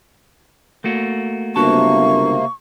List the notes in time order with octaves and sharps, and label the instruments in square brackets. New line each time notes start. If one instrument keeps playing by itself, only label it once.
[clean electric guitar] A3 A#3 F#4
[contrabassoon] G1 [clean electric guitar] C#2 F#4 A5 [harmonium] C3 A#3 [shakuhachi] C#6